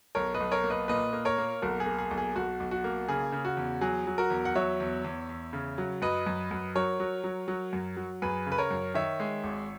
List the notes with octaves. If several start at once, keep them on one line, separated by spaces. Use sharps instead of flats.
B1 A#4 C#5
B4 D#5
B1
A#4 C#5
A#3
B4 D#5
A#2 B4 D#5
A#3
A#4 C#5
A#3
B1 F#4 A#4
G#4
A#3
G#4
B1
G#4
B1 F#4
B1
F#4
A#3
C#3 G#4
C#3
F#4
E2
F#3 G#4
F#3
F#4 A#4
E2
F#5
F#3 C#5 E5
E2
E2
E2
C#3
F#3
F#2 B4 D#5
F#2
F#2
F#3 A#4 C#5
F#3
F#3
F#3
F#2
F#3
F#2 G#4 B4
C#3
B4
A#4 C#5
F#2
D#3 C#5 E5
G#3
G#1